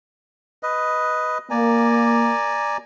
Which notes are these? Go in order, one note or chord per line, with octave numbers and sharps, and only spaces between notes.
B4 D#5
A#3 D5 G#5 A#5